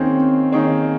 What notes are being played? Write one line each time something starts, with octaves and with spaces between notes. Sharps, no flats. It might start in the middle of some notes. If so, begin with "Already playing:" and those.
Already playing: D#3 A#3 C4 C#4 D#4 G#4 C#5
D#3 A#3 D#4 G#4 C#5